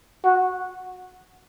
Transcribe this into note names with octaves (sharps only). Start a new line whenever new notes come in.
F#4